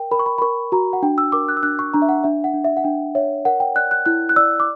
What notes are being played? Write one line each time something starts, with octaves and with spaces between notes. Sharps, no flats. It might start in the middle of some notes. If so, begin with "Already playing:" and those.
Already playing: A#4 G5
A#4 B5
C#6
B5
B5
A#4 C#6
F#4 A#5
F#5
D4 G5
E6
A#4 D6
F#6
E6
D4 F#6
C#6
D4 A#5
E5
F#5
D4 E5
F#5
D4
E5
F#5
D4 G5
C#5 E5
A#4 F#5
G5
D5 F#6
F#6
E4 F#6
F#6
D5 E6
D6